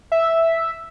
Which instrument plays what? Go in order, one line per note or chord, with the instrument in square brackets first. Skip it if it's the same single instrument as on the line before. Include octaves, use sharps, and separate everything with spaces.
[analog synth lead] E5